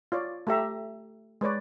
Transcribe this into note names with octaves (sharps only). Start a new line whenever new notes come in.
F4 C#5 D5
A3 G4 E5 A#5
G#3 B4 C#5 D5